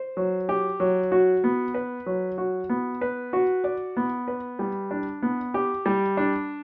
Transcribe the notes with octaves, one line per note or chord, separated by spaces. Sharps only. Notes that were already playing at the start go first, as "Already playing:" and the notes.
Already playing: C5
F#3
G4
F#3
F#4
B3
B4
F#3
F#4
B3
B4
F#4
D5
B3
B4
G3
D4
B3
G4
G3
D4